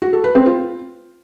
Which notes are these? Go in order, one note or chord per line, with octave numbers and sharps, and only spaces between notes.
F#4
A4
B4
C4
F4